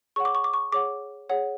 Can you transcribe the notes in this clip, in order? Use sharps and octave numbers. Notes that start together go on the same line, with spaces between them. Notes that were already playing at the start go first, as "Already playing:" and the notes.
G#4 C#5 F#5 C#6
D6
C#6
D6
C#6
G#4 C#5 F#5 D6
G#4 C#5 F#5